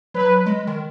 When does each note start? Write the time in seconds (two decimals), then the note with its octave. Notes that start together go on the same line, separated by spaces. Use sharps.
0.14 F#3 B4
0.46 G#3
0.67 D#3